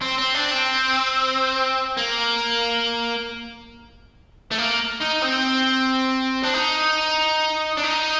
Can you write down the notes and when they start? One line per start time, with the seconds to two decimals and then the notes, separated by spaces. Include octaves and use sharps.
0.02 C4
0.18 C4
0.34 D4
0.51 C4
1.97 A#3
4.51 A3
4.58 A#3
5.02 D#4
5.23 C4
6.43 D4
6.55 D#4
7.78 D4
7.84 D#4